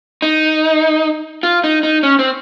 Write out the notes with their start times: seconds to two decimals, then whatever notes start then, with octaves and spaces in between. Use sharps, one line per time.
0.22 D#4
1.43 F4
1.64 D#4
1.83 D#4
2.03 C#4
2.19 C4